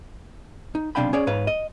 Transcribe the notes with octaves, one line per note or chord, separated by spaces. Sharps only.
D#4
B1 C3 D4 F5 G5 B5
C#4 G#4 C#5 D5
G#2 B4 C#5 F5
D#5